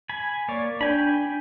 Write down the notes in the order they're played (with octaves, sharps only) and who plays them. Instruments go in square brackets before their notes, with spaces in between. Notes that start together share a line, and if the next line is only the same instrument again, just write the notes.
[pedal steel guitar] G#5 B5
A#3 C#5 D5
[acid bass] D4 [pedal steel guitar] G5 G#5 B5